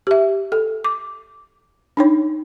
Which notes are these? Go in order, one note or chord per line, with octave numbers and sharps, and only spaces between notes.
G4 E5
A4
D6
D4 D#4 C#5